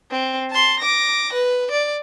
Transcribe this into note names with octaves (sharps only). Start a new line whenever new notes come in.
C4
A5 C6
D6 A#6
B4
D5